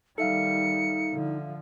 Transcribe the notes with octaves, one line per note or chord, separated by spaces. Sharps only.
D#3 G3 D#4 A4 E5 F5 C#7
D3 F3